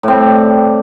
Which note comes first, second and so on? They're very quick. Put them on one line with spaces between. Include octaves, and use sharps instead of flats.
A2 C4 G3